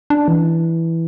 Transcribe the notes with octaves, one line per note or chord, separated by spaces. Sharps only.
D4
E3